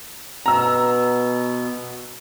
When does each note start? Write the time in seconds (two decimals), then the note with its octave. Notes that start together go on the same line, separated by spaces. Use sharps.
0.46 B2 B3 A#5 E6